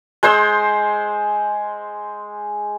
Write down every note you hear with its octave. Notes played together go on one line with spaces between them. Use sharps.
G#3 C5 C6 E6